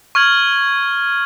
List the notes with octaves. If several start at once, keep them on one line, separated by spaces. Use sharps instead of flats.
C#6 F6 G#6 F#7